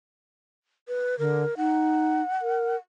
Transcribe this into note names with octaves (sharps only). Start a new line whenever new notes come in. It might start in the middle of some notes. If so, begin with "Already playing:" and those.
B4
D3 A#4
D#4 F#5
A#4